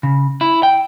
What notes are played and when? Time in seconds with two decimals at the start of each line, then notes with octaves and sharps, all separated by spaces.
0.03 C#3
0.41 E4
0.63 G5